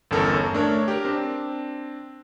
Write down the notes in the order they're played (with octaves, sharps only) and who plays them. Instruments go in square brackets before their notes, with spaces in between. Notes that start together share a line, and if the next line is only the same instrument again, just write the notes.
[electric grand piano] G1 E2 C#4 A4 A#4
A3 D4 A#4 C#5
G4 A#4
C4 D4